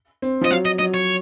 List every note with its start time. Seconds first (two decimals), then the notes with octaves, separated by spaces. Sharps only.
0.22 C4
0.41 F3 D#5
0.50 F#3 F5
0.65 D#5
0.79 F#3 D#5
0.94 C#5